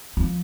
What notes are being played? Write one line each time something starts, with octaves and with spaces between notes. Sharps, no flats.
F3